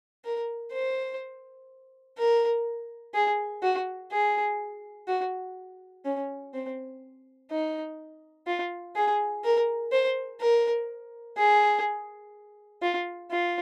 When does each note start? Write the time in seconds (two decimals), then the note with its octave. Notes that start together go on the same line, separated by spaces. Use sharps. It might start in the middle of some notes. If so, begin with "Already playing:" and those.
0.25 A#4
0.73 C5
2.18 A#4
3.14 G#4
3.62 F#4
4.11 G#4
5.08 F#4
6.05 C#4
6.54 C4
7.51 D#4
8.47 F4
8.96 G#4
9.44 A#4
9.92 C5
10.40 A#4
11.37 G#4
12.82 F4
13.31 F4